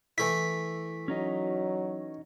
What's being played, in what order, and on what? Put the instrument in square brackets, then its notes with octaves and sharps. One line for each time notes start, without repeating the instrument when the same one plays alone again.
[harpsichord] E3 A3 E4 [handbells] B6
[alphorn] F#3 [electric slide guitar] C#4 D#4 D#5